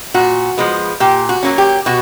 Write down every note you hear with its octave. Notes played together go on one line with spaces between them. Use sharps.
A#2 F#4
F3 G#3 B3
A#2 G4
F#4
F#3 A#3 C#4
G4
B2 F#4